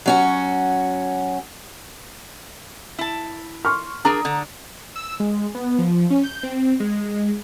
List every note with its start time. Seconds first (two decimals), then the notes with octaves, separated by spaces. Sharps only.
0.06 F#3 C#4 F#4
2.99 E4 A5
3.65 C6 C#6 F6
4.05 D4 G#4 A#4 A#5 D#6
4.25 D3
4.96 E6
5.20 G#3
5.55 B3
5.78 F3
6.10 C#4
6.23 G6
6.43 C4
6.80 G#3